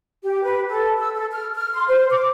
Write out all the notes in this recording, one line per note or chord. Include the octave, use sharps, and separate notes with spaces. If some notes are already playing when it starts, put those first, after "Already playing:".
G4
B4
A4
E6
A4
F6
F6
C6
C5
D6